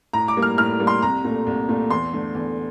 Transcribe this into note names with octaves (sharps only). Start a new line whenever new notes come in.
A2 A#5
D6
G3 A#3
F6
A2 F6
G3 A#3
C6
C2 A#5
A#2 A3
C2
A#2 A3
E2 C6
D3 A3
E2